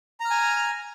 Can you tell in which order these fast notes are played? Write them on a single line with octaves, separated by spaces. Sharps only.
A#5 F6 G#5